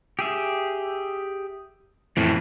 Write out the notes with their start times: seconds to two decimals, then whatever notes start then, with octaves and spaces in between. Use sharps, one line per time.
0.19 G4 G#4 E5
2.17 F2 A2 E3